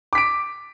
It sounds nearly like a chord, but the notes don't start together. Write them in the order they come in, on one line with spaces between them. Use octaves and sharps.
D6 B6 D7